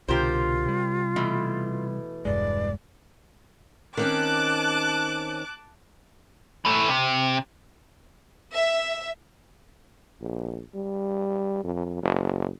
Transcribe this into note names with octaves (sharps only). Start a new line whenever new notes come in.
C2 B2 D3 F4 G4 A#4 C5
C3 G3
B2 E3 A3
E1 G2 G#3 D5
D#3 C4 C#4 A5 D6 F#6
E3 A3
C3
E5
A#1
G3
F2
F#1